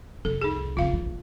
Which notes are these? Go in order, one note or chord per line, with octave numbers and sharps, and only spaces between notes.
C2 F2 A4
D#4 G#4
C#3 C4 F4 F5
E3
A#1